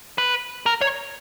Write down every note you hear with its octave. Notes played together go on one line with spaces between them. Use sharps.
B4
A#4
C#5